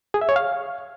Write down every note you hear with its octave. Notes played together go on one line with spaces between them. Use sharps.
G#4
E5
C#5
F5